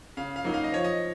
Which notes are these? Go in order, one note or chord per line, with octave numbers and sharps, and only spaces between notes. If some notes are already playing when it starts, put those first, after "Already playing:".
C#3 F5
F5
F#3 A#3 D#4
F5
D#5
F3 C#5
D#5